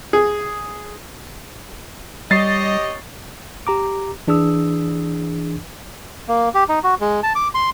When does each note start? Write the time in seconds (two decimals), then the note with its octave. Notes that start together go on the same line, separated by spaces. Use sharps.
0.13 G#4
2.31 G3 G4 C#5 D#5 A6 C7
3.67 G4 A#5 D6
4.28 E3 D4 G#4 D#6 E6
6.28 A#3
6.54 G4
6.69 D#4
6.84 F#4
7.01 G#3
7.23 A5
7.35 D6
7.54 C6